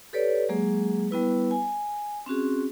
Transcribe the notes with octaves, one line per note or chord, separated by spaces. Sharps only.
G4 A4 B4 C#5 D5
F#3 G#3 A#3 G#4
G3 B3 E4 B4
G#5
C4 C#4 F#4 G#4